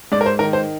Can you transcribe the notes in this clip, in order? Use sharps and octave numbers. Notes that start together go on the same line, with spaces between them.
G#2 D5
A#4
C5
D#3 A#4
C5